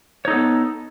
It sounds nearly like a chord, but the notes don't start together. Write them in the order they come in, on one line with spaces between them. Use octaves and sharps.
C#5 D#4 A4 B3